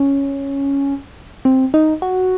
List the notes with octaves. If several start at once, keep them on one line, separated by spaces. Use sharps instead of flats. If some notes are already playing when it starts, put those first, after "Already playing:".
Already playing: C#4
C4
D#4
F#4